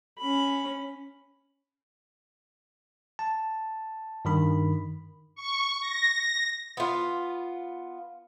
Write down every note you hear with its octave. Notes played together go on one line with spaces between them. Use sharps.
C#4 B5
A5
G2 D#3 B5
C#6
A#6
B3 F4